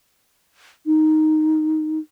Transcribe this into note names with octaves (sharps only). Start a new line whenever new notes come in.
D#4